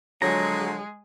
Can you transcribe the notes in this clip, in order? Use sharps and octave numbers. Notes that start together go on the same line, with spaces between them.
D3 F3 F#3 G#3 G#4 A#5